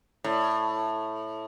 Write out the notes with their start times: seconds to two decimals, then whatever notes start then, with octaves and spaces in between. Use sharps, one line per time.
0.24 A2